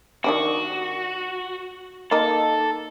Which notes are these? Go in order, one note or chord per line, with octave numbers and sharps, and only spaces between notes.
D#3 D4 F#4 G4
A#3 D#4 A4